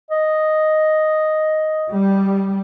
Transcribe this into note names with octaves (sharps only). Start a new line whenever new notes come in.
D#5
G3